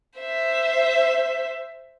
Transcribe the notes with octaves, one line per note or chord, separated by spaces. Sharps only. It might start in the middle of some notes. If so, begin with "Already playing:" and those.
C5 E5